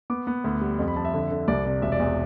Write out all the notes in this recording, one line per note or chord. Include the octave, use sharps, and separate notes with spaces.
B3 D6
B3
D2
G3
F2
B5
F2 A5
E5
D3
D3
C2 D5
C3 D5
E1 E5
D5
E2 E5